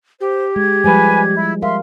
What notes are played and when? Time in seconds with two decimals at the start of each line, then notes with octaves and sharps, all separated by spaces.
0.21 G4 C5
0.56 G#3 G#6
0.84 F3 G3 G#3 B4 G#5
1.34 E4
1.62 A#4 E5 F5 C6